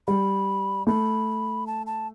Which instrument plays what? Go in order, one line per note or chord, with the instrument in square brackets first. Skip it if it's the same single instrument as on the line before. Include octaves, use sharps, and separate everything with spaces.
[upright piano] G3 [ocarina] B5
[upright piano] A3 [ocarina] B5
[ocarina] A5
A5